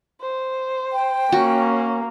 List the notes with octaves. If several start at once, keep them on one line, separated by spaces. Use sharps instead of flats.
C5
G5
A#3 C#4 F#4